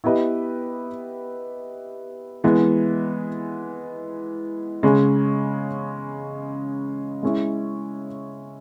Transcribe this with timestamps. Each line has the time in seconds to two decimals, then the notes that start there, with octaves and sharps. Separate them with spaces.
0.04 B3 E4 G4 B4 D#5
2.44 E3 G#3 B3
4.83 C#3 G#3 C#4
7.23 G#3 C#4 E4